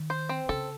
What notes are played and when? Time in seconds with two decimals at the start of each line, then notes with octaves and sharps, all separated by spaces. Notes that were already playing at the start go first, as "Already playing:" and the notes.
Already playing: D#3
0.10 C5
0.29 C4
0.49 C#3 A4